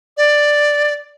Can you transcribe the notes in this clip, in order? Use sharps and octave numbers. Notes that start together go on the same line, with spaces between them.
D5